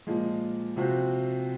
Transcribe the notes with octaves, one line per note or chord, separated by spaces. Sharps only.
A#2 F3 G#3
C3 F3 C4 F#4